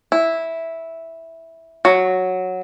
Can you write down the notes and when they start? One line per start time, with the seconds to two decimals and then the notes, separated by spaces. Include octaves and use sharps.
0.12 E4
1.85 F#3